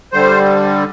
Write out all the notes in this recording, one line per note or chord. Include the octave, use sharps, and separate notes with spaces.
D3 G3 C5